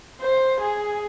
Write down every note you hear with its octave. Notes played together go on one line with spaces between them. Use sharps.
C5
G#4